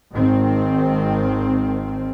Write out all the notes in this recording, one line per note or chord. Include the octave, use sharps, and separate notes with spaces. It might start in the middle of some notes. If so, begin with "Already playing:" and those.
G#1 D#3 C4